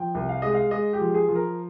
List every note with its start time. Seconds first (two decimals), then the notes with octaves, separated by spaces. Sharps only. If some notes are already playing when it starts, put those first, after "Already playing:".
Already playing: F3 G5
0.15 C2
0.29 F5
0.42 G#3 D#5
0.54 F5
0.71 G#3 D#5
0.93 G4
0.99 F3
1.14 G#4
1.29 F3
1.35 A#4